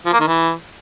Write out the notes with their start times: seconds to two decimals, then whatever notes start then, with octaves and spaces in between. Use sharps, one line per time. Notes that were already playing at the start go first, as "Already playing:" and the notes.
0.06 F3
0.13 A#3
0.20 D#3
0.27 E3